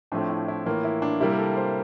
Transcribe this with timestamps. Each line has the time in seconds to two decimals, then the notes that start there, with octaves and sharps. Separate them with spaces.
0.12 A2 F3 A3 C4 D4
0.30 E4
0.48 E4
0.66 A2 E3 A#3 F4
0.84 E4
1.02 D4
1.20 C3 G3 A#3 E4
1.30 A#4
1.38 A4
1.56 C5